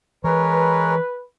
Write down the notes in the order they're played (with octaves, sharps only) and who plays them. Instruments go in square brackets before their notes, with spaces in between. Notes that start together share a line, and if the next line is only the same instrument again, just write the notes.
[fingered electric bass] E3 [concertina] G#3 A#4 C#5 [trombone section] B4